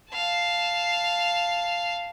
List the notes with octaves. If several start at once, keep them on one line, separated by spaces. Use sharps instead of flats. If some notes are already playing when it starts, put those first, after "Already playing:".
F5 A5